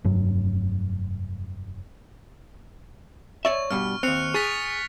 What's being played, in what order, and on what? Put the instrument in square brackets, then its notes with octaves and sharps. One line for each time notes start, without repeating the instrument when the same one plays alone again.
[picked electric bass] F1 G2 F#3
[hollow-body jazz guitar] C#5 D5 E5 [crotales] C#6
[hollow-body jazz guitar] G2 B2 G3 [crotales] F6
[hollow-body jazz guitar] D#2 C4 [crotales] F#6 C#7 F7
[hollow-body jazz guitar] G#4 [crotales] C#6 A6 B6